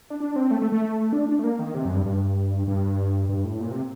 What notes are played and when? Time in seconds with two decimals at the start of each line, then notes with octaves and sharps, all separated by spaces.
0.10 D4
0.20 D4
0.36 C4
0.51 A3
0.62 A3
0.72 A3
1.13 D4
1.29 D4
1.39 A3
1.44 A#3
1.59 D#3
1.74 C3
1.85 F#2
1.95 G2
2.06 G2
2.67 G2
3.29 G2
3.44 A2
3.61 A#2
3.71 C3